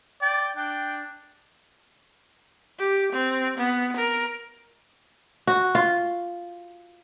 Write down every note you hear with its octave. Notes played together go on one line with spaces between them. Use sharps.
D5 G5
D4 G5
G4
C4
B3
A#4
F#4
F4